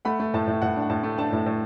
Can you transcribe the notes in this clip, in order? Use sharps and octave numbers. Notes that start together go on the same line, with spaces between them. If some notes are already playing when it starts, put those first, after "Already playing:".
A3 F#5 B5
A3
A2 A5
A2
A2 F#5
D4
F#5
A2 A5
A3
D4 A5
A2
A2